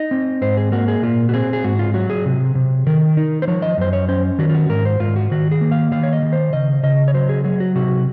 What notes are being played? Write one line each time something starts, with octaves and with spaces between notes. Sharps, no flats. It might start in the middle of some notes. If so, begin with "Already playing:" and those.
Already playing: D#4 D#5
C4
G#2 C5
G#4
A#3 F#4
G#4
A#2 F4
F#4
C4 G#4
G#4
G#2 F#4
F4
F#3 F#4
G#4
C3
C3
D#3 A#4
D#4
C5
F3 C#5
D#5
F#2 C5
C#5
C#4 C5
D#3 F#4
F4
F#4
G#2 A#4
C5
G#2 F4
F#4
D#3 F#4
G#4
A#3
F5
D#3 F5
C#5
D#5
D#3
C5
C#3 D#5
C#3 D#5
C#5
F#3 C5
G#4
F#3 G#4
F#4
C3 F#4